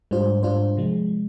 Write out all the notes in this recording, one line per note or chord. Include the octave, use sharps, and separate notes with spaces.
G#2 G3 D4 F4 C5
G#2 G3 D4 F4 C5
C3 F3 G#3